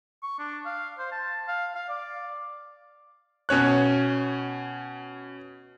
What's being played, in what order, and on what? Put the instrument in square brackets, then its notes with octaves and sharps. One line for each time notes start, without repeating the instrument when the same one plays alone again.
[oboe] C#6
D4
F5
C5
A5
F5
F5
D5
[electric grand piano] B2 C#4 C#5 F#6